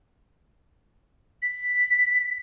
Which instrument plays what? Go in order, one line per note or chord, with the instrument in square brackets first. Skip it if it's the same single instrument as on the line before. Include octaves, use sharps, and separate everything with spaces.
[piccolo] B6